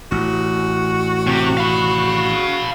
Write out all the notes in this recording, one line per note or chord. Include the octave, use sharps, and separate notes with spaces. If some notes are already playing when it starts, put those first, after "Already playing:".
A1 F#4
C3 G4
F5 B5